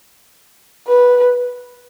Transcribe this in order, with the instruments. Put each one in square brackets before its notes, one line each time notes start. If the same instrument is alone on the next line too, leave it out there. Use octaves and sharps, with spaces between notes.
[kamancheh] B4